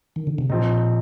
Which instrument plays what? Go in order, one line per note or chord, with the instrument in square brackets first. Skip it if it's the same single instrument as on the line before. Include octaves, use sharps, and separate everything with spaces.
[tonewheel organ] D#3
D3
C3
[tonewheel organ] A#2 [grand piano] F3 C4 D#4